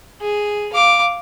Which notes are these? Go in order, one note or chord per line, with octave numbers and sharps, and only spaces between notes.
G#4
F5 D6